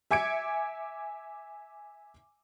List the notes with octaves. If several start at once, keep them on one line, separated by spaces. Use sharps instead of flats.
E5 G#5 D6 G#6 C#7 D7